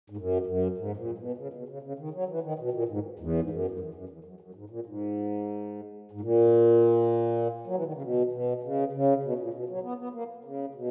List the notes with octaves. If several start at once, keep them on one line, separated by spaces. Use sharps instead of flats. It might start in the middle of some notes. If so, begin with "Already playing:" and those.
G#2
F#2
F#2
G#2
A#2
B2
C#3
B2
C#3
C#3
D#3
F#3
E3
D#3
B2
A#2
G#2
E2
G#2
F#2
F#2
E2
F#2
E2
F#2
F#2
G#2
A#2
G#2
G#2
A#2
F#3
E3
D#3
C#3
B2
B2
C#3
C#3
B2
A#2
B2
F#3
B3
B3
A#3
C#3
B2